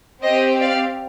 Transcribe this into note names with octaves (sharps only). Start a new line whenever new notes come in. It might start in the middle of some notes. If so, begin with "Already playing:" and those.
C4 G4 C5 D#5
D5 F5